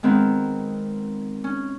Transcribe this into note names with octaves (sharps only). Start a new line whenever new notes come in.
D#3 G#3 B3 C4
C#4